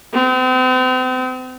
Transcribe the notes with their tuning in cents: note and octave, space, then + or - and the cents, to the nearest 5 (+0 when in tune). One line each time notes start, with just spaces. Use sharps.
C4 -40